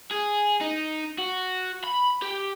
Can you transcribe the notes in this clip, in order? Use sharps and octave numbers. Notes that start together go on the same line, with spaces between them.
G#4
D#4
F#4
B5
G4